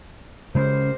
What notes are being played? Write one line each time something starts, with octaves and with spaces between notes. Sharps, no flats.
C#3 G#3 C#4 G4 A#4 C5